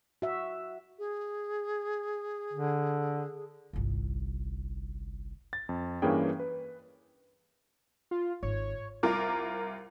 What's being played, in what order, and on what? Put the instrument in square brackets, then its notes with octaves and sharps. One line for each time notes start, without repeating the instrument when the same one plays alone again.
[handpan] F#4 E5
[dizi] G#4
[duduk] D3
[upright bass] G1 C2
[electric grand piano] A6
F2
G2 E3 A#3 C#4 G#4 G5
B4
[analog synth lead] F4
[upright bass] G#1 [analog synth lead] C#5
[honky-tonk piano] C2 F4 A#4 D6